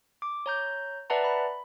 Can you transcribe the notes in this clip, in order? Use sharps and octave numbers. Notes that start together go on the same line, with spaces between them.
D6
C#5 A#5 G6
B4 D5 E5 F#5 A5 A#5
B5